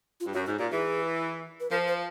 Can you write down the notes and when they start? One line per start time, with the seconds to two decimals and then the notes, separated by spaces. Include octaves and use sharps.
0.20 F4
0.24 G2
0.33 F#2 F#4
0.46 G#2 F#4
0.58 A#2 G4
0.71 E3 G#4
1.60 B4
1.70 F3 A#4
1.88 C5